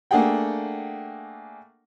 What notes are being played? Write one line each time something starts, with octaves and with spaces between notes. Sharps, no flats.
A3 A#3 D4 G#4 F#5 G5